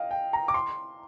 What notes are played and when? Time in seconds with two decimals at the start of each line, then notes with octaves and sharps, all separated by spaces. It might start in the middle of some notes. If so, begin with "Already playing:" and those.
Already playing: D#5 F5 G5
0.11 G5
0.33 A#5
0.48 D6
0.54 C6